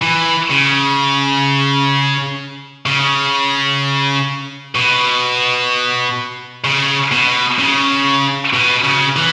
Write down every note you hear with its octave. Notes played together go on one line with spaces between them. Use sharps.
E3
C#3
C#3
B2
C#3
B2
C#3
B2
C#3
E3